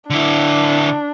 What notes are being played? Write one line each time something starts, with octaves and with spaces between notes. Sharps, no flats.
D3 D4 E4